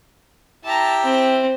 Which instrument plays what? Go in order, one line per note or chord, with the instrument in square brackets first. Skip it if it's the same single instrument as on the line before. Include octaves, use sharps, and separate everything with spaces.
[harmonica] E4 G4 [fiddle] A5 A#5
[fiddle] C4